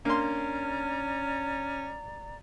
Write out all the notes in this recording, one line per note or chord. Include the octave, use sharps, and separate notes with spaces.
A#3 C#4 D4 D5 A#5 C6